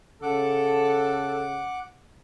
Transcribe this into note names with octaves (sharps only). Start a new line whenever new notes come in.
C#3 A4 F#5 D6